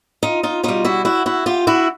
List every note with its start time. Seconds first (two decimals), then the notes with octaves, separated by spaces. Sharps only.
0.23 D#4 F4
0.43 D#4 F4
0.63 B2 G3 D#4 F4
0.85 E4 F#4
1.05 E4 F#4
1.26 E4 F#4
1.46 F4 G4
1.67 E4 F#4